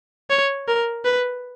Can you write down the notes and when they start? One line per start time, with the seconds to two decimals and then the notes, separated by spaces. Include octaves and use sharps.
0.30 C#5
0.68 A#4
1.05 B4